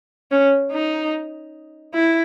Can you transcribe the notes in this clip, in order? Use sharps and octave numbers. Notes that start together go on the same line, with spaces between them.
C#4
D#4
E4